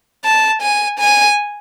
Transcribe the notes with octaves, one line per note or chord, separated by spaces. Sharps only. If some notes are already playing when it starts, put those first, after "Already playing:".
A5
G#5
G#5